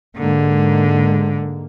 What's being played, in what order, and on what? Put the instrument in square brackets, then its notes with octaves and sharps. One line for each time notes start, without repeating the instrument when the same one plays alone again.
[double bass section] G#2 G#3 A#3 [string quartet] D3